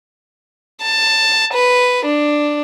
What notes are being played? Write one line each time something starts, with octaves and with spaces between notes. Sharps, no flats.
A5
B4
D4